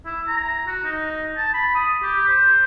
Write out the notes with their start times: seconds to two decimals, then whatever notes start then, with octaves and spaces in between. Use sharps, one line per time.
0.05 E4
0.27 A#5
0.67 F#4
0.84 D#4
1.37 A5
1.54 B5
1.75 D#6
2.02 G4
2.28 C5